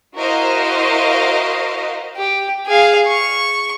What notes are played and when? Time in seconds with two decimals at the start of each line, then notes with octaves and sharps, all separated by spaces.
0.15 E4 F#4 A#4 C5 D#5 F5
2.17 G4
2.67 G#4 F5
3.08 C#6